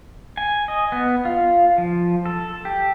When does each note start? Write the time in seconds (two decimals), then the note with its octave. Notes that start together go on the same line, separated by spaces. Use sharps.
0.37 G#5
0.68 D#5
0.92 B3
1.25 F4
1.78 F3
2.26 A4
2.65 G4